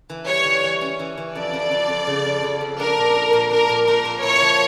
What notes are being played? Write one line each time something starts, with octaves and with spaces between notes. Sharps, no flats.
E3
G3 C#5
E3
E3
C#4
E3
E3
F2 D5
F2
F2
F2
C#3
F2
F2
F2
D4 A#4
A#2
A4
A#2
D4 A#4
A#2
A#2 A#4
A#2
E4 C#5
F3